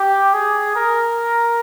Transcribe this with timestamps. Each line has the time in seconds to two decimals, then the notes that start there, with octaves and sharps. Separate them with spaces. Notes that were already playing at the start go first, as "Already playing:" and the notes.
Already playing: G4
0.33 G#4
0.76 A#4